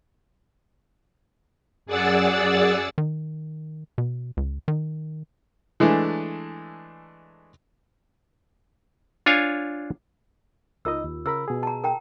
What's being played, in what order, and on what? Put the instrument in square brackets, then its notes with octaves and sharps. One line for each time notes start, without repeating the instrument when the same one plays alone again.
[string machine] F#2 G#4 D5 F#5 E6 A6
[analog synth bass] D#3
B2
C#2
D#3
[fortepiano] E3 G#3 A3 D4
[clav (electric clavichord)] D4 F4 C#5 F5 G#5
[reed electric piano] C#2 D#4 D#5 [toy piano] F4 A#4 E6
[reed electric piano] D#2
[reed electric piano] C#3 A#4 B5 [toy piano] E6
[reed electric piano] B2 G#4
[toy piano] A5 A#5
A#4 G5 A#5